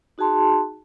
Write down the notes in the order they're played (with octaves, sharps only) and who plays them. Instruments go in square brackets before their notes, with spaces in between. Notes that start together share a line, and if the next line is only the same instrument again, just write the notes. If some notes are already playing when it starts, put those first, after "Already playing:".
[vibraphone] D#4 F#4 G#4 A5 C6